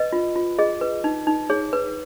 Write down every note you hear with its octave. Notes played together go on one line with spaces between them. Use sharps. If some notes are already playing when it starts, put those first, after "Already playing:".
Already playing: B4 D#5
F4
F4
G#4 D#5
B4
D#4
D#4
G#4 C#5
B4